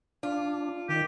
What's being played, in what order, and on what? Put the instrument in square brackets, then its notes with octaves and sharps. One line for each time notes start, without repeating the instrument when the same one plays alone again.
[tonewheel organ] D4 [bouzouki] F4
[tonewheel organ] D#3 [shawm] G4